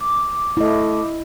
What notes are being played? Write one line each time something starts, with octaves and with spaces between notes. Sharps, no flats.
D6
A3 E4 D#5